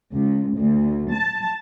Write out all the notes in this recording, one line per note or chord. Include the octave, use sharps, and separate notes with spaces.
C#2
D2
A5